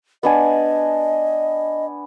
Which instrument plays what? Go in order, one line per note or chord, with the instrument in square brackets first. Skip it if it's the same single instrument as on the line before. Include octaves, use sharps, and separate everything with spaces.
[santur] B3 D4 G#5 [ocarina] D#5